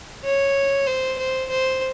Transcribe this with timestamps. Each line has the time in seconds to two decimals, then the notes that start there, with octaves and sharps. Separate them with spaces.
0.24 C#5
0.87 C5
1.18 C5
1.50 C5